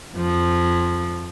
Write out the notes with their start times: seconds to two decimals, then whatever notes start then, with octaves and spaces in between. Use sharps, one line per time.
0.14 F2 F3